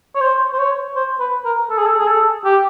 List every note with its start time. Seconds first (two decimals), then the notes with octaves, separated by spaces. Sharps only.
0.15 C#5
0.21 C5
0.53 C5
0.59 C#5
0.96 C5
1.20 B4
1.45 A#4
1.70 A4
1.79 G#4
1.87 A4
1.99 G#4
2.08 A4
2.45 G4